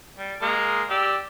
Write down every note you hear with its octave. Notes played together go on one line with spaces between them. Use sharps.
G3
G#3 A#3 A#5
G4 D5 E6